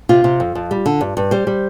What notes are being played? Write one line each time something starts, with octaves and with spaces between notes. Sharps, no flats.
C3 F4
C3
F2
F2
G3
D3
G2
G2
G3 C5
G3